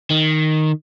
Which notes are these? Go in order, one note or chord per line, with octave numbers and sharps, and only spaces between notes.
D#3